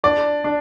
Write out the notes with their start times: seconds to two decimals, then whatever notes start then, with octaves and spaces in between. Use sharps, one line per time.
0.04 D4 D5
0.44 D4